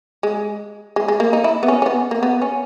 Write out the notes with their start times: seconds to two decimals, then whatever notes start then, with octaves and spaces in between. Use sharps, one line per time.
0.23 G#3
0.96 G#3
1.08 G#3
1.20 A#3
1.33 D#4
1.44 E4
1.63 B3
1.68 C#4
1.82 C#4
1.86 B3
2.11 A#3
2.23 B3
2.42 C#4